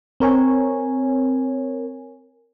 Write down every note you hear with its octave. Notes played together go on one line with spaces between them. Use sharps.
C4 A#4 C#5 G#5